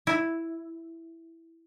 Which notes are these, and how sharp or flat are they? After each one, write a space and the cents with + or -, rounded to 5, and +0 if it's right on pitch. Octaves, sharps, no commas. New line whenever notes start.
E4 +0